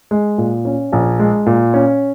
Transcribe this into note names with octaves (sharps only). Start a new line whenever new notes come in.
G#3
A#2
C#4
A#1
G#3
A#2
C#4